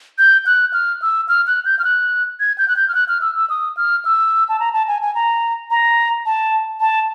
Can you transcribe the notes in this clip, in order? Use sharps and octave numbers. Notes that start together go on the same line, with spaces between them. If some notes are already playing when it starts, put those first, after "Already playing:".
G6
F#6
F6
E6
F6
F#6
G6
F6
F#6
G#6
G6
F#6
G6
F6
F#6
F6
E6
E6
D#6
F6
E6
A5
A#5
A5
G#5
G#5
A#5
A#5
A5
A5